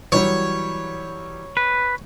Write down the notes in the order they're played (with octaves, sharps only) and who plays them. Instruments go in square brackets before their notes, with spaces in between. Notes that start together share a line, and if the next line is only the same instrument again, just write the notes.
[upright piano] E3 F#3 G3 [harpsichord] C#5
[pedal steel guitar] B4